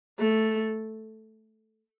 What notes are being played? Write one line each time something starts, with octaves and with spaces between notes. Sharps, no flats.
A3